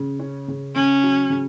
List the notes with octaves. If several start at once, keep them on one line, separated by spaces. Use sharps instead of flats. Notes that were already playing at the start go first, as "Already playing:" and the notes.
Already playing: C#3
C#4
C#3
C#3 C#4
F#3
C#3